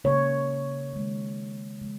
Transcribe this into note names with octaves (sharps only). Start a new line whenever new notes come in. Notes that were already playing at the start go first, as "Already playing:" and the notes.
C#3 A#3 C#5
D#3 G#3
C#3 F3 G#3